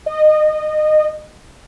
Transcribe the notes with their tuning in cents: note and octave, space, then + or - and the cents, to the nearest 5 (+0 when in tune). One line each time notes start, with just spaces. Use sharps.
D#5 -25